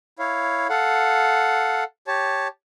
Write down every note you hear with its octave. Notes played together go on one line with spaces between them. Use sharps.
E4 C#5 F5
A4 F5 F#5
G4 C#5 A5